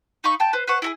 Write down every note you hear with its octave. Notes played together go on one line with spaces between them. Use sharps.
D#4 F5 B5 C#6
G5 A5 G6
B4 C5
B4 C5 F#5 C#6
E4 F#4 G#4